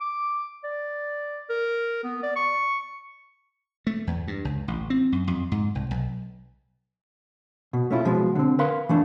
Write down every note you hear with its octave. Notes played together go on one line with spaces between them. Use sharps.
D6
D5
A#4
B3
D5
C#6
A3
E2
G2
C#2
A1
C4
F#2
F2
G#2
C2
B1
B2
A3 C#4 E4 F4
B2 F3 G#3
D3 C4
A#4 B4 F5 C6
E3 A3 D4